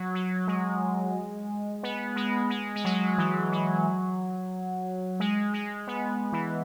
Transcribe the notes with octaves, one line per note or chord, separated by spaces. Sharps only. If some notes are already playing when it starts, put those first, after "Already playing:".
Already playing: F#3
F#3
G#3
B3
G#3
G#3
G#3
F#3
E3
F#3
G#3
G#3
B3
E3